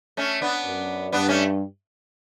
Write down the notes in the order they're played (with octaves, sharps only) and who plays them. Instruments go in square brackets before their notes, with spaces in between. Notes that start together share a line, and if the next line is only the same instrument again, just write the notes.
[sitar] A3 C#4
B3 D4
[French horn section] F#2
[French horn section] G2 [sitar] B3 D4
[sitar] A3 C#4